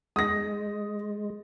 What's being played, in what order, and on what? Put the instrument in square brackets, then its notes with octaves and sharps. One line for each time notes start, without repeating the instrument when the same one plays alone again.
[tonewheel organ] G#3 [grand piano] D#6 A#6